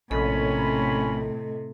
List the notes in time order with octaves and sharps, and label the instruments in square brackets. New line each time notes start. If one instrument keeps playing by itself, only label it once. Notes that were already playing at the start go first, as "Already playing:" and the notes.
[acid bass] A#1 [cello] A2 C3 [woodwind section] C#4 C#5 B5 [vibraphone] A4 D#5